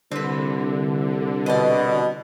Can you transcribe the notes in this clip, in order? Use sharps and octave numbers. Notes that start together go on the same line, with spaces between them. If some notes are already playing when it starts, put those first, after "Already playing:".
C2 D3 C4 B4
B2 D5 D#5